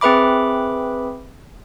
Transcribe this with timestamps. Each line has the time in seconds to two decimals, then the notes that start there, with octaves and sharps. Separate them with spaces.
0.01 C4 G#4 B4 E5 B5 D6